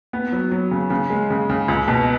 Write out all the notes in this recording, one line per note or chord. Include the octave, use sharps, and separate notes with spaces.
B3
F#3
F#3
C#3
C#3
G#3
C#3
C#3
C#2
B2